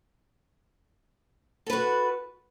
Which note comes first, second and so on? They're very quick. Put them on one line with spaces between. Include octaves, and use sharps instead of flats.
A4 B4 F#4